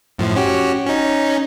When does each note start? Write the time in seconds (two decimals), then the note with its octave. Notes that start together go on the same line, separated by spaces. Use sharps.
0.18 F#2 A2 F3
0.36 C#4 F#4 G4
0.86 C#4 D#4